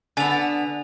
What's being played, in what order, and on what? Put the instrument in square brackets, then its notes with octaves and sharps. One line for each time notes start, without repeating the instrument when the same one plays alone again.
[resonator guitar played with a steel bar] D3 B3 [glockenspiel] G#5 F7